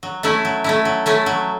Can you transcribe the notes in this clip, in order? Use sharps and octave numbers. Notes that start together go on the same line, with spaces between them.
F#3
A3 C#4 E4
F#3
A3 C#4 E4
F#3
A3 C#4 E4
F#3